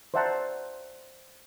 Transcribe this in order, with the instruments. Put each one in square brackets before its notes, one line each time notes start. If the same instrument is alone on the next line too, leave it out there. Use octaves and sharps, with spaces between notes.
[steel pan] C5 D5 E5 F#5 A5 A#5